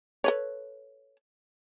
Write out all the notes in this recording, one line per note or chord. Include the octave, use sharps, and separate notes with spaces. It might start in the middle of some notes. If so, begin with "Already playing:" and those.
A4 B4 C#5